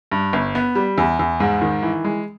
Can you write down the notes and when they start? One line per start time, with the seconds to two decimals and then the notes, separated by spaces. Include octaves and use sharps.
0.12 G2
0.33 G1
0.55 B3
0.75 G3
0.98 E2
1.19 E2
1.40 G#2
1.61 D#3
1.83 E3
2.04 G#3